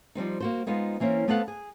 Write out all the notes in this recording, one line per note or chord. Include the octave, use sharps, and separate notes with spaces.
F3 G3 C4 D#4
A#3 F#4 C5
G#3 B3 D#4 F4 C5
E3 A#3 C4 C#4
A3 B3 C4 A4 F5 F#5
G#4